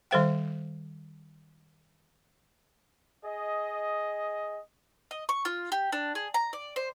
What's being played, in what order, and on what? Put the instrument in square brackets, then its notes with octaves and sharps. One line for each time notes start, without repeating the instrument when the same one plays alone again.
[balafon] D#3 G3 A4 C5 F5 G5
[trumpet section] G#4 D#5
[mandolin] D#5
C#6
F4
G4
D4
G#4
A#5
D5
C5